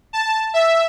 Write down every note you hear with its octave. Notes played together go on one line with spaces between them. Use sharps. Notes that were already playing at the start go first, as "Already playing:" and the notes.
A5
E5